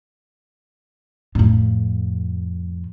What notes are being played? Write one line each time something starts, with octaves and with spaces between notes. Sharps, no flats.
F2 A2